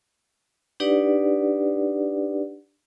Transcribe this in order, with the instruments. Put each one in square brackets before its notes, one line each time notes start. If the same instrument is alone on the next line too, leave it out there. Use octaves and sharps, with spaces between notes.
[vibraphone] D4 D#4 G4 B4 D5 F#5